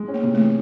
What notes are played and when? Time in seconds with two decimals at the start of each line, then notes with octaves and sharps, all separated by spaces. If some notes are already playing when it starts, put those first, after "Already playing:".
Already playing: G#3
0.08 C#4
0.14 A#3
0.23 C3
0.34 E3 A3